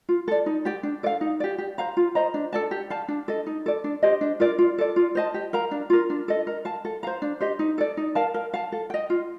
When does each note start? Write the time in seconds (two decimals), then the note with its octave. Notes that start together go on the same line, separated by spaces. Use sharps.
0.09 F4
0.28 A4 D5
0.46 D#4
0.65 G4 D5 G5
0.83 D4
1.03 A4 D5 F5
1.21 D#4
1.40 G4 D5
1.58 G4
1.78 C5 F5 A#5
1.97 F4
2.15 C5 D#5 A#5
2.34 D4
2.53 A4 D5 A5
2.71 G4
2.90 D5 F5 A5
3.08 D4
3.28 A4 D#5
3.46 D#4
3.66 A4 D5
3.84 D4
4.03 G4 C5 D#5
4.21 D4
4.40 F4 A#4 D5
4.58 F4
4.78 A4 D5
4.96 F4
5.15 C5 D#5 A5
5.34 G4
5.53 A#4 F5 A#5
5.71 D4
5.90 F4 A#4
6.10 D4
6.28 A4 D#5
6.47 A#4
6.65 F5 A5
6.85 A4
7.03 C5 F5 A#5
7.22 D4
7.41 G4 C5 D#5
7.59 D#4
7.78 A4 D5
7.97 D#4
8.15 A#4 F5 A5
8.34 A#4
8.54 F5 A5
8.72 A4
8.90 D#5 G5
9.10 F4